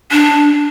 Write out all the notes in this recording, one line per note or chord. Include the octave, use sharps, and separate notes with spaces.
D4